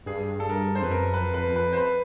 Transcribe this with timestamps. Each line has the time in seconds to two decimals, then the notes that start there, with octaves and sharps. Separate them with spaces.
0.06 G2 G#4
0.40 A4
0.50 A#4
0.75 C5
0.81 F2 B4
0.92 F#2 A#4
1.14 B4
1.20 F2
1.34 B4
1.48 F2
1.56 B4
1.73 C5
1.77 B4